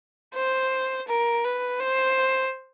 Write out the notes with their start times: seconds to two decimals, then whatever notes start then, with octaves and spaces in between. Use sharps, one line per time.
0.34 C5
1.08 A#4
1.44 B4
1.80 C5